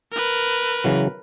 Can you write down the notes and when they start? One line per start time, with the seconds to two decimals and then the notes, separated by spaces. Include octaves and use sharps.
0.12 A#4 B4
0.84 C#3 E3 F#3